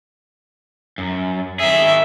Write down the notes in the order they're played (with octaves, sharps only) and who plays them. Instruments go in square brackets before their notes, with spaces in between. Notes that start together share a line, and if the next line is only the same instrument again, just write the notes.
[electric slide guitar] F#2
[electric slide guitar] D#3 G#4 [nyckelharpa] E5